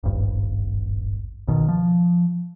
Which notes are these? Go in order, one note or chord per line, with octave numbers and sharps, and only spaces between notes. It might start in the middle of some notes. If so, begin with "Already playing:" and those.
D#1 G#1 G2
B1 B2 D#3
F3